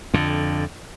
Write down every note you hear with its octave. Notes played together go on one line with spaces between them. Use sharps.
F2 D3